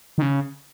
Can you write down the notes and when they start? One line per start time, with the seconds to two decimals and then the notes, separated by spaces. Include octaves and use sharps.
0.18 D#3
0.22 C#3